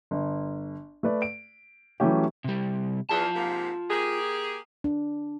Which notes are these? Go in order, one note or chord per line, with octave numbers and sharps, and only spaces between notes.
G1
A3 B4 D5
D7
E3 F#3 G3 A3 C#4 G4
C3 G3
E2 F4 A5
G#2 C3 A#3
A#3 G4 G#4
D4